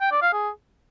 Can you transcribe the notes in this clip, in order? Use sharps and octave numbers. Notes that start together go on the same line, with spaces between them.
G5
D5
F5
G#4